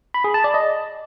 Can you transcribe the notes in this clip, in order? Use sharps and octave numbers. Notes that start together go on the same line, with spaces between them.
B5
G#4
A5
D5
D#5